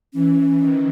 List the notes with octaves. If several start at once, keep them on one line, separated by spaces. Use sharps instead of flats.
E3 C#4
D#3